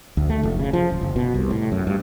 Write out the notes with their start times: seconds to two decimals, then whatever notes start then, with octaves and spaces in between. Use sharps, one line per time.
0.17 D2
0.29 A3
0.43 F1
0.59 C#3
0.73 F3
0.90 D1
1.01 F#1
1.16 B2
1.34 C2
1.51 A2
1.72 F#2
1.87 G2